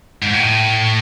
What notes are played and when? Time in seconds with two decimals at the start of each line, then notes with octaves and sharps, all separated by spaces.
0.22 G#2
0.33 A2